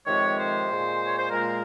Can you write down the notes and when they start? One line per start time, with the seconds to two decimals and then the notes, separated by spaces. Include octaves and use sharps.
0.06 F2 C3 D#3 G#3 C#5
0.38 C5
0.69 A#2 G#3
1.06 C#5
1.19 C5
1.31 A#2 G#3 A#4